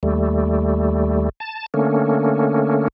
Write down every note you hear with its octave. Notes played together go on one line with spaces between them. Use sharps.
D#2 G3 A3
A5
D3 A3 A#3 C#4